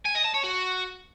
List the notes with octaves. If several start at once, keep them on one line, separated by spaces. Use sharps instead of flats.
G#5
D#5
A5
C#5
F#4